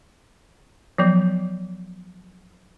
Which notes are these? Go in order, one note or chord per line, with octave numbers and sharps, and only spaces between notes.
F3 F#3 B3